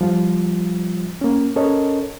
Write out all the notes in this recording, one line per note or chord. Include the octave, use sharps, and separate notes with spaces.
F3 G3 F4
A#3 C#4
C#4 A4 A#4 C#5 D#5